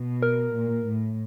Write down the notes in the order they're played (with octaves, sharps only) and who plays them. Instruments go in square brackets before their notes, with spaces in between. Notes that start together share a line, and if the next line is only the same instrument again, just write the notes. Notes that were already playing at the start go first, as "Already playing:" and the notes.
Already playing: [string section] B2
[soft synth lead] A#4
[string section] A#2
A2